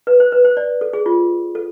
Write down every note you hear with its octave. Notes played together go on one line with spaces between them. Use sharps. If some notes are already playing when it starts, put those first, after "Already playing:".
B4
C5
B4
C5
D5
A4
G#4
F4
A4